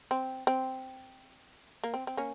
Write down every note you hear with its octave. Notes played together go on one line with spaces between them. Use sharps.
C4
C4
A#3
C4
C4
A#3 C#4